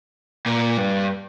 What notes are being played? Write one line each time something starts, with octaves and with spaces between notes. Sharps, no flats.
A#2
G2